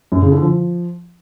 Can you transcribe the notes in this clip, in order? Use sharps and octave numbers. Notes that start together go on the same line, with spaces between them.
F#2
C#3
D3
F3